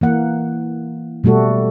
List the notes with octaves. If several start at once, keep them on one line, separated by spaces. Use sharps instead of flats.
E3 A#3 F#5
B2 G3 A3 F#4 A4